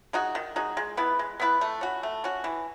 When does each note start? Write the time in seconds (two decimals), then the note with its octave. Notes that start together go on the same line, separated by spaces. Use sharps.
0.13 G#3 D#4 F#4
0.35 D#3
0.56 G#3 D#4 F#4
0.77 G#3
0.97 B3 E4 B4
1.19 G#3
1.40 B3 E4 B4
1.61 A3
1.81 C#4 F#4
2.03 A3
2.24 C#4 F#4
2.44 E3